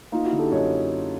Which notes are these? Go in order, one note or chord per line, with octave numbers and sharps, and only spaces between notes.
A#3 D#4 F4
E4 F#4
D3
G4 A4
F#2 C#5 D#5